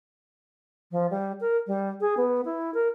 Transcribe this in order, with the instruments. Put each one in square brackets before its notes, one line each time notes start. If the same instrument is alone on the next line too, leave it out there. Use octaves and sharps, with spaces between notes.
[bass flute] F3
G3
A#4
G3
G#4
B3
E4
A#4